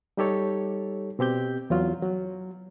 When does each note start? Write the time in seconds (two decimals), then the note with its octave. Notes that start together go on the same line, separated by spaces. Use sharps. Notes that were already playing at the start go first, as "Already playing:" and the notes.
0.17 G3 D#4 G4 A4 C#5
1.19 B2 C4 G4 G6
1.70 E2 F#3 F4
2.03 F#3